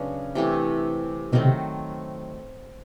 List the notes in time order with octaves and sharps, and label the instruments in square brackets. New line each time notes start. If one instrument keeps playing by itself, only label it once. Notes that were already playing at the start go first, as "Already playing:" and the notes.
Already playing: [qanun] C#3 F#3 B3 D4
C3 E3 A3
[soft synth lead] B2 [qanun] D#3 F#3 A3 C4
[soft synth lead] C3